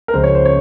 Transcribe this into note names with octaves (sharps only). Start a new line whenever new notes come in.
A#4
C#2 C#3 F3 C5
C#5
C5
C#5